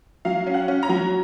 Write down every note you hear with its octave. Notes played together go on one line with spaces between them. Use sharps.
F#3 F5
C#4
F#5
C#4
A#5
F#3